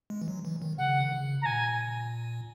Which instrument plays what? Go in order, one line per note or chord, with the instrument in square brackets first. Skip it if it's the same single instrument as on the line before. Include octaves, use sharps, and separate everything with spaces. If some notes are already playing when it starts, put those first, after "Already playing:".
[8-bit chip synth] G#3
E3
F#3
E3
D#3
[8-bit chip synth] C#3 [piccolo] F#5
[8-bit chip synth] D#3
C#3
[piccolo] A#5
[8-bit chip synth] A#2 [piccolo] G#5